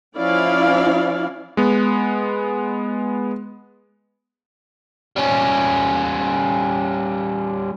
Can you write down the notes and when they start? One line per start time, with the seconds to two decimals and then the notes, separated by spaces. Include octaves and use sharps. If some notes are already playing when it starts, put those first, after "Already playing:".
0.18 F3 C#4 E4 D5 F5
1.57 G#3 B3
5.16 G3 C#4